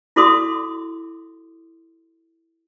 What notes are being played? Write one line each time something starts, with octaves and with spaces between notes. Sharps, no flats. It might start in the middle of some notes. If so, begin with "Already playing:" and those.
E4 F#4 A4 C6 D6 D#6